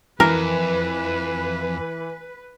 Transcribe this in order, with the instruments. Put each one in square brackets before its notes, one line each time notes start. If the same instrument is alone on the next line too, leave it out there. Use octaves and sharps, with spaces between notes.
[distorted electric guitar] F2 [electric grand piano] E3 [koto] A#4 [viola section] B4